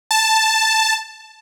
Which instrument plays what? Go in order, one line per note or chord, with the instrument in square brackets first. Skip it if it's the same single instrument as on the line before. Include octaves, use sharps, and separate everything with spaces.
[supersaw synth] A5